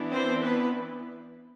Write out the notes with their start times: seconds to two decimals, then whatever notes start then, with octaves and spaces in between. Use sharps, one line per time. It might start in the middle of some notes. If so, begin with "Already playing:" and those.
Already playing: E3 B3 D4
0.12 C4 C5
0.42 B3 B4